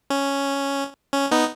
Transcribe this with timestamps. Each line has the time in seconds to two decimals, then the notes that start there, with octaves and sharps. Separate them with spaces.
0.10 C#4
1.14 C#4
1.31 B3 D#4